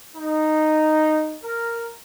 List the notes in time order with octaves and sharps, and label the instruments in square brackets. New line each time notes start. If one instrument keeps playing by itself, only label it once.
[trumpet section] D#4
A#4